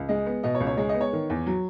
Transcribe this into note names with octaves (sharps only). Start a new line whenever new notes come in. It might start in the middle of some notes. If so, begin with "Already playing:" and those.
Already playing: C#2
G#3 D#5
B3
B2 D#5
C#5
C#2
C#5
G#3 C#5
D#5
B3
C#5
D#3
E2
F#3